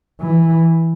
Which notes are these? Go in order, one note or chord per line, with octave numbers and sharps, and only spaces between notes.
E3